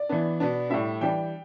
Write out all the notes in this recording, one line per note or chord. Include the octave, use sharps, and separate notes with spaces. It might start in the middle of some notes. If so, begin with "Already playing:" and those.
Already playing: D5
E3 B3 D4
B2 B3 D4
A2 G3 D4 E5
E3 G3 D4 G5